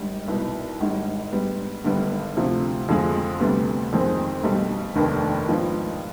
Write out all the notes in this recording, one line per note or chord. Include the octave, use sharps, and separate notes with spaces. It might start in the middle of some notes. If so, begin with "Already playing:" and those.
Already playing: G#1 G#2 G3 D4
C2 B2 B3 D#4
G#1 G#2 G3
G#2 G3 B3
G#1 G2 D3 G3 B3
D2 C3 F3
F2 D3 F3 G#3
D2 C3 G3 B3 D4
F2 D#3 G#3 C4 D#4
B1 B2 G3
F1 D#2 D#3 B3 D4
G#2 F3 B3